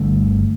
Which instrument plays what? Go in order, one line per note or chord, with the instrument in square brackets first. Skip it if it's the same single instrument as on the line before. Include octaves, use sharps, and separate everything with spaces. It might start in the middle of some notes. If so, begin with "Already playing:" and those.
Already playing: [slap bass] G1 G2 D3 A3